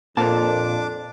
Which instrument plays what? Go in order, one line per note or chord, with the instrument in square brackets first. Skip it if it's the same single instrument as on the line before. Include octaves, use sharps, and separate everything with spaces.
[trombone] F2 [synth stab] A#2 [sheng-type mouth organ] D4 D6 [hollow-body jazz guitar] C5 F5 A5